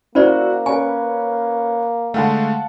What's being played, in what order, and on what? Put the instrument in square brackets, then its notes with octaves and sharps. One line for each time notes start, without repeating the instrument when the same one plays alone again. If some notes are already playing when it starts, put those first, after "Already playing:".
[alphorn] A#3 [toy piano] C#4 C5 D5 [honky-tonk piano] E4 F#4
[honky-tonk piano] C#4 B4 [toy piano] G#5 [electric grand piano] C#6
[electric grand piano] D3 G#3 A3 [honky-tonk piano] F5 F#5 A5